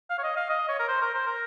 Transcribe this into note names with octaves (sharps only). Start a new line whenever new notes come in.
F5
C#5
D#5
F5
D#5
C#5
A#4
C5
A#4
C5
A#4